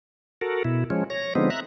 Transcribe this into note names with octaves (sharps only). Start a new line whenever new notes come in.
F#4 A4 A#4
B2 E4
F3 G#3 C#4
C#5 A#6
D3 F3 G#3 B3 C4 D#4
E5 A#5 F#6